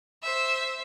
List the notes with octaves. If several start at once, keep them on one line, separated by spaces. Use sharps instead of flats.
C5 E5